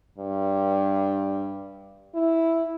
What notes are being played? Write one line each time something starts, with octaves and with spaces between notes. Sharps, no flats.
G2
E4